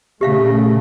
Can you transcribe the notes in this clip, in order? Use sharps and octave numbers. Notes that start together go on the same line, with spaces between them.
A#2 C#3 A3 G4 E5 F5